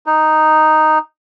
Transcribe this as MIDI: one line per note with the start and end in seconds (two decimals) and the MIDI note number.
0.06 0.98 63